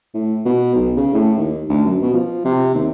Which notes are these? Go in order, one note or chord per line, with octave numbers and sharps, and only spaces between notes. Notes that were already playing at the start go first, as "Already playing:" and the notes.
A2
B2
B1
C#3
A2
D#2
D2
F#2
B2
F3
C3
D#2